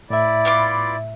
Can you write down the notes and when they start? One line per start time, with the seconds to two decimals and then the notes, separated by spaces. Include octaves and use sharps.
0.10 A2 E4 D5 E5
0.45 B3 F4 D6